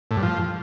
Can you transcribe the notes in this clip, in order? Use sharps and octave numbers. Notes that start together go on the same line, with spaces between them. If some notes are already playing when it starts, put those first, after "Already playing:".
A2
G2
F3